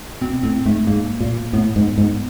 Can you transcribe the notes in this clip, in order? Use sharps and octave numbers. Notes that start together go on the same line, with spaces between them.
B2 C4
A2 C4
G#2 A3
G#2 A#3
A#2
A2 B3
G#2
G#2